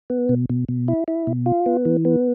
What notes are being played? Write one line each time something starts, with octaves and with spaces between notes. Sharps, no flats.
B3
B2
B2
B2
E4
E4
B2
F4
B3
E3
B3